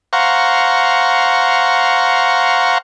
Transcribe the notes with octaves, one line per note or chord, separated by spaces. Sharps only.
C5 F5 F#5 A#5 C#6